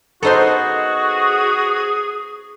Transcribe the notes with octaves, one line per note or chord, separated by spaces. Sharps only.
B3 D#4 F#4 G#4 A4 C5 C6